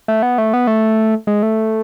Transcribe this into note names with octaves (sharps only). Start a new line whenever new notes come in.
A3
B3
A3
B3
A3
G#3
A3